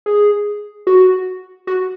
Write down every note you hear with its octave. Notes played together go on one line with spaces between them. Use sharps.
G#4
F#4
F#4